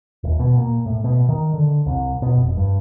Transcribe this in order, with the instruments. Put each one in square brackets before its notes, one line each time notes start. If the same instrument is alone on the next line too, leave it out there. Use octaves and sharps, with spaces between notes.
[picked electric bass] D#1
B2
A#2
A2
B2
D#3
D3
C2
B2
F1
G2